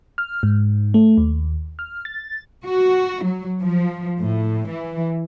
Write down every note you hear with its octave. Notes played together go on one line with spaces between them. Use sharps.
F6
G#2
A3
D#2
F6
A6
F#4
F#3
F3
A2
E3